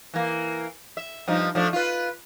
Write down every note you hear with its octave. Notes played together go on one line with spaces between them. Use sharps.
E3 A#3
E5
G2 F3 D#4
F3 A3 D4
F4 B4